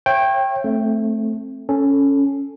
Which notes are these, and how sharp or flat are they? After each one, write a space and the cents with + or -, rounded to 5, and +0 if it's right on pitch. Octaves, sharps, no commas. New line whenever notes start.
C#5 -35 E5 +35 G5 +0
A3 +0 C4 +15
C#4 +0 A4 +0